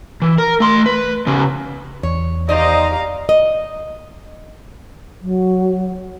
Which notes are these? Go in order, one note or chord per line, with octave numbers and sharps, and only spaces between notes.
E3
A#4
A3 C6
B4
C#3 B3
E2 C#5
D#3 D#4 G4 C5 D5 D#5 F5 A#5
D#5
F#3